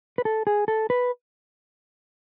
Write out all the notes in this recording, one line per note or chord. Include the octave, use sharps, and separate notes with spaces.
B4
A4
G#4
A4
B4